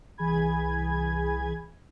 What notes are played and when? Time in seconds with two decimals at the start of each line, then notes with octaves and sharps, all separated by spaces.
0.18 C2 E3 G#4 G#5 B5 G#6